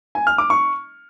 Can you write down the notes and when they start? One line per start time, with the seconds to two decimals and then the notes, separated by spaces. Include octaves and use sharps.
0.15 G#5
0.27 F6
0.38 D6
0.50 C#6